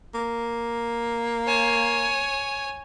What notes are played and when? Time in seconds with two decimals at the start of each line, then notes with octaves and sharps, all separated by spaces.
0.14 A#3
1.47 C#5 G#5